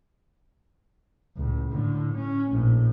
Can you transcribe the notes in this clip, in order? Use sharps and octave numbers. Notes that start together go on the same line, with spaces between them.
C#2 A2
A2 D3
C#4
A#1 A2